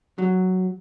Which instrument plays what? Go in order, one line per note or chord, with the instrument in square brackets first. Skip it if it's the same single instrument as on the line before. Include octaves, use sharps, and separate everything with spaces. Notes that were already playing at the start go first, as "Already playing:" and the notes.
[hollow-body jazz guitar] F#3